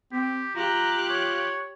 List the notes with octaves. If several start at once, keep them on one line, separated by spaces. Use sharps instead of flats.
C4 G4
F4 G4 A#5 F#6
C#5